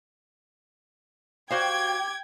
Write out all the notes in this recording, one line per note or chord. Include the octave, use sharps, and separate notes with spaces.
F#4 G4 C5 F5 G5 G#6